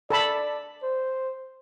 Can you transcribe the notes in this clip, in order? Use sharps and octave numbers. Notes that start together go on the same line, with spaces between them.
A4 D5 A5 B5
C5